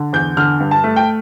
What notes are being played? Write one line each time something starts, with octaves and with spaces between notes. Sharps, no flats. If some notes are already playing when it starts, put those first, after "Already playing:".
Already playing: D3
E2 G6
D3 F6
G2
A5
A3
G5